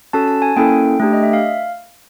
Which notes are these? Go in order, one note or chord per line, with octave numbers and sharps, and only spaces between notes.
C#4 F#4 A4 A5
A5
G#5
A#3 C#4 E4 A4 G5
A3 D4 G4
D#5
E5
F5